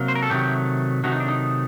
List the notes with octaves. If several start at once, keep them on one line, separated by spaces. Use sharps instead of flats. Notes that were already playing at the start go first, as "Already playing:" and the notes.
Already playing: C3 F#3 A#3
C5
A#4
A4
C3 D#3 F#3 A3 G4
C3 D#3 F#3 A3 F#4
D#4
D4
D#4